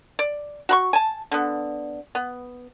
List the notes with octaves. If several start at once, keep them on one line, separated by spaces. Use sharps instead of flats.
D5
F#4 B5 C#6
G#5 A5
D3 B3
B3